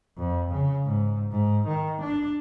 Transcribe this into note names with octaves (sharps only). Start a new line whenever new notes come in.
F2
C#3
G#2
G#2
D#3
D4